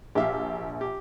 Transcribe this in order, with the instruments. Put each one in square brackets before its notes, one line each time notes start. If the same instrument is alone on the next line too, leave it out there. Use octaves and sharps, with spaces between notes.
[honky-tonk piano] A#1 [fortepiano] G4 E5 F5
[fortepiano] G4